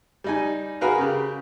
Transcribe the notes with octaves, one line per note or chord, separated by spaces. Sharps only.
G3 D#4 G#5
F#4 G#4 A#4 B4 F5
C#3 G4